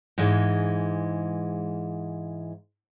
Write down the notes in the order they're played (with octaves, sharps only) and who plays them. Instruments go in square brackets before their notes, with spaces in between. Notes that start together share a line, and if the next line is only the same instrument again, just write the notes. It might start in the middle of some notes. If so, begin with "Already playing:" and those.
[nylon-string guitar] G#2 E3 G#3